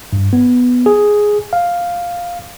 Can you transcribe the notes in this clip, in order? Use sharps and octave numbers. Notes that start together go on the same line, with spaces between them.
G2
B3
G#4
F5